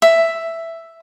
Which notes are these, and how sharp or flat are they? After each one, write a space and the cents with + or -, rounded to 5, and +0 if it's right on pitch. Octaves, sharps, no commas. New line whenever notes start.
E5 +5